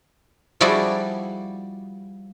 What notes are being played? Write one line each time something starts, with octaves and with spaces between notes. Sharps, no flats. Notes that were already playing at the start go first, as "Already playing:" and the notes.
F3 G3 E4 F#4 G#4 D5